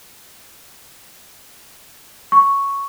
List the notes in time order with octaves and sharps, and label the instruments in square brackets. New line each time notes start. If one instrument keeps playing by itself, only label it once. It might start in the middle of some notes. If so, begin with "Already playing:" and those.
[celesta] C#6